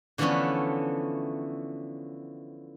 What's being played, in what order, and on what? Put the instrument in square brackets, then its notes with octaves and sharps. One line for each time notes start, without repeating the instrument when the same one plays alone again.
[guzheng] D3 E3 F3 A3 B3 C#4